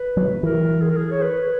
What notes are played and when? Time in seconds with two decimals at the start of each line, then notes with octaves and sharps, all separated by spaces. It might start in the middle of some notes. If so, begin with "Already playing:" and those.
Already playing: B4
0.17 F#3
0.43 E3 A#4
0.82 G#4
0.90 A#4
0.97 G#4
1.11 C#5
1.22 B4